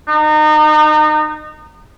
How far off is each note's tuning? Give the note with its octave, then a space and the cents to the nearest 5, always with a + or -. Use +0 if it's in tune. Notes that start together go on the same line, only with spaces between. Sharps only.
D#4 -30